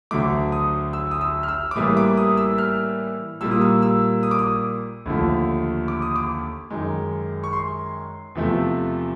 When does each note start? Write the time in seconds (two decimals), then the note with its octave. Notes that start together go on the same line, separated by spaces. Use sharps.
0.11 D2 D3 F#3 A3 D6
0.52 D#6
0.93 E6
1.11 D#6
1.21 E6
1.43 F6
1.48 E6
1.71 D6
1.76 A2 E3 G3 A#3 D#6
1.97 D6
2.17 D#6
2.37 E6
2.58 F6
3.41 A#2 G3 A#3 E6
3.51 D#6
3.62 E6
3.82 E6
4.23 D#6
4.31 D6
4.39 D#6
5.06 D#2 D3 F3 A3
5.88 D6
6.02 D#6
6.16 D6
6.70 F#2 D#3 G#3
7.44 C#6
7.53 C6
8.35 E2 C3 F3 A3